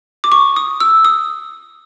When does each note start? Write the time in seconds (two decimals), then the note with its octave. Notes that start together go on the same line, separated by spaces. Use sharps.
0.24 D6
0.32 C#6
0.56 D#6
0.80 E6
1.05 D#6